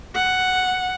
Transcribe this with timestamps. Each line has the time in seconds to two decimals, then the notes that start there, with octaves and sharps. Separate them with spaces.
0.15 F#5